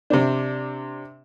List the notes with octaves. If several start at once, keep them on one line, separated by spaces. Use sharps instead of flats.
C3 C4 D4